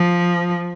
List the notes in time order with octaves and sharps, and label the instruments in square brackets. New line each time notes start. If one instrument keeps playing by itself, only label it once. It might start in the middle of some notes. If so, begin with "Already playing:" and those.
Already playing: [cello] F3